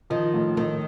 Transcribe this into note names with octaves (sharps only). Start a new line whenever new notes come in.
D#3 F3
A2
A2 D#3